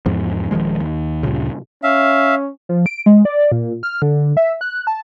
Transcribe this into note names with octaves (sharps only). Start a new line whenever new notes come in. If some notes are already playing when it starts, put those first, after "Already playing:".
E2 G#2 F3
D#1 D#3 F3 G#3
D#2
D2 G2 A#2 C#3
C#4 E5 F5
F3
D7
G#3
D5
A#2
F6
D3
E5
F#6
A5